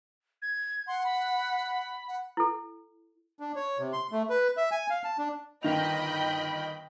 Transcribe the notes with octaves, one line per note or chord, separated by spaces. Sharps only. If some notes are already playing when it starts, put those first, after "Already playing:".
G#6
F#5 C6
B5
F#5
E4 A4
D4
C#5
C3
C6
A3
B4
E5
G#5
F5
A5
D4
G1 D#3 D#5 G5 B5 F7